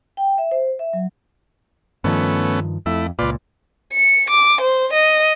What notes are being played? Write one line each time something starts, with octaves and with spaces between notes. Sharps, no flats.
G5
E5
C5
E5
F#3
G2 D#3 F3 A3 B3 C#4
F2 A3 E4
C#2 A#2 F4 B4 D5
C#7
D6
C5
D#5